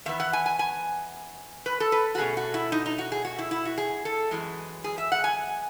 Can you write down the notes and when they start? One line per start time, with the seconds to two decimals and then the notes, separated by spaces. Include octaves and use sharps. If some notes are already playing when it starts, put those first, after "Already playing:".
0.06 E2 D#3 B3 E5
0.20 F#5
0.33 G#5
0.46 G#5
0.59 G#5
1.66 B4
1.80 A4
1.92 B4
2.15 F#4
2.18 B2 A3 C#4 G#4
2.37 F#4
2.54 E4
2.72 D#4
2.86 D#4
2.98 F#4
3.12 G#4
3.25 F#4
3.39 E4
3.51 E4
3.65 F#4
3.78 G#4
4.05 A4
4.31 F#2 E3 G#3
4.84 G#4
4.98 E5
5.12 F#5
5.24 G#5